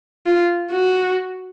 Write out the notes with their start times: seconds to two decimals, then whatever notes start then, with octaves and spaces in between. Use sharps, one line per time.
0.27 F4
0.72 F#4